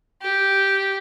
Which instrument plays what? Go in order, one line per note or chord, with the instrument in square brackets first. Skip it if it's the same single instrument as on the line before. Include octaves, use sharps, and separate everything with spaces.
[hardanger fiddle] G4